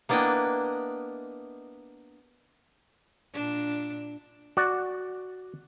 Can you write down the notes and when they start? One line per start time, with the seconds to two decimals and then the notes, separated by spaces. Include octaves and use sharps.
0.09 A#3 B3 D4 E4 D#5 G5
3.33 A#2 D4
4.57 F#4 D5